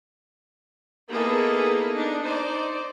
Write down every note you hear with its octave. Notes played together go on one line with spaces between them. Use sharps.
A#3 B3 D#4 E4 G#4 A4
D4 D#4
D#4 C5 D5